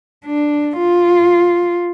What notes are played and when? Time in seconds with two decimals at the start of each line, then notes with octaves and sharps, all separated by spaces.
0.25 D4
0.78 F4